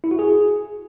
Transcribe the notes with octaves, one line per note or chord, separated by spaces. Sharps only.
E4
F#4
G#4